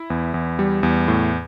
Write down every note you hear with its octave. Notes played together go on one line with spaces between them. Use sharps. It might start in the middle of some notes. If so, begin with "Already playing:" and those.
Already playing: E4
E2
E2
G3
E2
A2